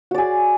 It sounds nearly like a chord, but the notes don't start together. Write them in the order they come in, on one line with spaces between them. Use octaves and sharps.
F#4 D5 G#4